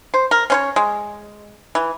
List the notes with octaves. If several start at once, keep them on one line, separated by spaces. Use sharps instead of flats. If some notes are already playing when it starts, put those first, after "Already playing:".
C5
A#4
C#4 C5 C#5
G#3
E3